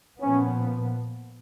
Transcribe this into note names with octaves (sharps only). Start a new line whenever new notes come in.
A#2 F3 B3 C#4